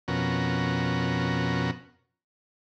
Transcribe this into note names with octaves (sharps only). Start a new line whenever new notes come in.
F2 B2 C#4 F#4 A#4